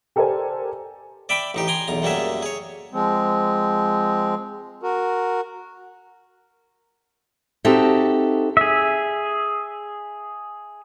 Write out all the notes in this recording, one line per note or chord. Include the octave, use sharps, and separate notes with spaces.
G4 A4 A#4 C5 D5 G#5
D5 E5 G5 B5 D6
A1 D#4 G4
G5 G#5 A#5 C6
B1 E2 A#5
F#2 G3 A3 A#3 G#4 E5
G#4 C#5
F3 G#3 C4
F#4 A#4
C4 D#4 F#4 G4 A4 E5
G#4 E5